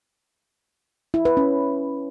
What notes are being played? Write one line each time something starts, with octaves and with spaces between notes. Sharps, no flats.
E4
B4
C#4